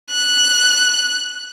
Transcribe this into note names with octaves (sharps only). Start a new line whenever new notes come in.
F#6